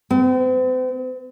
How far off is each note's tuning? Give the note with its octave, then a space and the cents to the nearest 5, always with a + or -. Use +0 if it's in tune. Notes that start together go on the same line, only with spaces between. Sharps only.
C4 -40